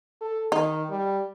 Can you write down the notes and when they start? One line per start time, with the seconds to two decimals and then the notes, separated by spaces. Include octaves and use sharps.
0.22 A4
0.52 D#3 D#4
0.90 G3